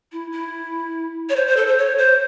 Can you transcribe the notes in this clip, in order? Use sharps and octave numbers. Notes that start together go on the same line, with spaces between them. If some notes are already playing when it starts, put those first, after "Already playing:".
E4
E4
C#5
C5
C5
A4
C5
C#5
C5